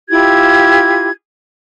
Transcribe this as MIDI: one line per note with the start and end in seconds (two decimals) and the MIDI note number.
0.09 1.09 64
0.09 1.09 65
0.09 1.09 67
0.09 1.09 92